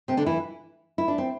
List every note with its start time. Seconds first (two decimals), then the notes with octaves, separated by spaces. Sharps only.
0.08 C3 C4
0.17 D3 D4
0.26 E3 E4
0.98 E4
1.08 D4
1.18 C4